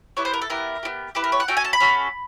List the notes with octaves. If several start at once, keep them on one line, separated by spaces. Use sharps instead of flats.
B3 E4 G4 C#5
C5
A#4
A4
B3 E4 G4 A#4
B3 E4 G4
B3 E4 G4 B4
A#4
C#5
F#5
C#4 F#4 A4 G5
G#5
A5
B5
C#4 F#4 A4